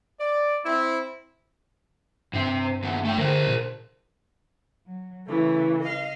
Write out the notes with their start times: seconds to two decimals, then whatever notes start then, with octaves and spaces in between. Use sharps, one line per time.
0.20 D5
0.65 C4 E4
2.34 G2 C3 C4
2.83 D#2 B3
3.05 A3 G5
3.18 D3 A#4 C5
3.47 A#2
4.87 F#3
5.26 C#3 E3 A3
5.82 D#5 F5